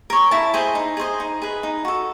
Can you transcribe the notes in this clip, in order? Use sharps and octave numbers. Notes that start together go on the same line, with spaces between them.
A#4 C#5
E4 A5
G#4 C5 D#5
D#4
G#4 C5 D#5
D#4
G#4 B4
D#4
F#4 A4